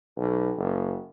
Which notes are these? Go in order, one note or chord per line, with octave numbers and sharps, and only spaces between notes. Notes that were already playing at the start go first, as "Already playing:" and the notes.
B1
F#1